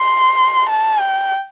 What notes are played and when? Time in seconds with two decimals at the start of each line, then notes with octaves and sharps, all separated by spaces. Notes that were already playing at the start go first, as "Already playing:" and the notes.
Already playing: C6
0.70 A5
1.00 G5